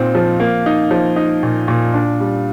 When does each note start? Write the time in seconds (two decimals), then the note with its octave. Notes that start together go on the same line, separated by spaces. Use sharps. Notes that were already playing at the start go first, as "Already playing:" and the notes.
Already playing: A#2 C4 D#4
0.15 F3
0.40 A#3
0.66 D#4
0.91 F3
1.16 D#4
1.43 A#2
1.68 A#2
1.94 D4
2.20 G3